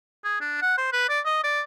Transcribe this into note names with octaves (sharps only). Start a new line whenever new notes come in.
G#4
D4
F#5
C5
B4
D5
D#5
D5